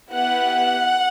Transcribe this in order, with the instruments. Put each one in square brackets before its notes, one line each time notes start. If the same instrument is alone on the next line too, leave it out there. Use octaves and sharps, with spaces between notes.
[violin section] B3 E4 G4 F#5